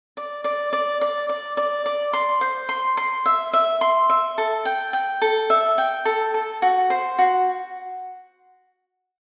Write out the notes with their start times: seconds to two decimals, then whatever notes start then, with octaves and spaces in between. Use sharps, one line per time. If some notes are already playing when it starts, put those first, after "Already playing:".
0.17 D5
0.44 D5
0.73 D5
1.01 D5
1.29 D5
1.57 D5
1.86 D5
2.13 C6
2.41 C5
2.69 C6
2.97 C6
3.26 E5
3.53 E5
3.81 C6
4.09 E5
4.38 A4
4.65 G5
4.93 G5
5.22 A4
5.50 E5
5.78 G5
6.05 A4
6.34 A4
6.62 F#4
6.90 C5
7.18 F#4